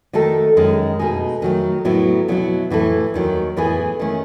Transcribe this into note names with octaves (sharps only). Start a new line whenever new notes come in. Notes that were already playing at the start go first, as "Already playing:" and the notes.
D#3 A3 D#4 F#4 A4
F#2 D#3 G#3
B2 A3 D#4 G#4
D#3 F#3 A3
A2 F#3 B3 E4
B2 F#3 B3 E4
A2 E3 A3 E4 A4
D#2 D#3 F#3
A2 E3 B3 E4 G#4
D#3 A3 C#4